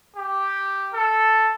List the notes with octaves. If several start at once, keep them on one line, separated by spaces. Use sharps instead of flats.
G4
A4